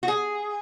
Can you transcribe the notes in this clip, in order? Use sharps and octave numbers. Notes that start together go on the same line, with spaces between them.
F#4
G#4